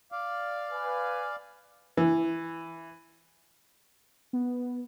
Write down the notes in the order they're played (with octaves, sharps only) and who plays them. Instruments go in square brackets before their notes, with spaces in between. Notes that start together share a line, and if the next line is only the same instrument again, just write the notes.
[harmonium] D5 F5
[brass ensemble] B4 G#5
[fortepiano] E3
[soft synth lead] B3